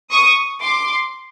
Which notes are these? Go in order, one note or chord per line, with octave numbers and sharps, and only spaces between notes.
C#6 D#6
C6 D6